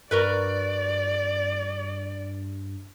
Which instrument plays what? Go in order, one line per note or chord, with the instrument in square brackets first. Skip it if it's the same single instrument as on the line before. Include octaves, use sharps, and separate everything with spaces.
[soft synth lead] G2 [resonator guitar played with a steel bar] F#4 A#4 B4 [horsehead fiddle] D5